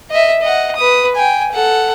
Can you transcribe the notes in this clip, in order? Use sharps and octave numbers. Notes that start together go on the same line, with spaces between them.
D#5 E5
D#5 F#5
B4 D#6
G5 G#5
A4 F#5